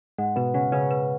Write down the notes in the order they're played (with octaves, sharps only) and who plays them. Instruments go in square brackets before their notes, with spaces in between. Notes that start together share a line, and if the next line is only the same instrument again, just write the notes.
[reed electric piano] G#2 G#3 [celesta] F#5
[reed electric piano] B2 B3 [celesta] B4
[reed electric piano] C#3 C#4 [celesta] F#5
[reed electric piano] C#3 C#4 [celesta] B4
[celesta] B4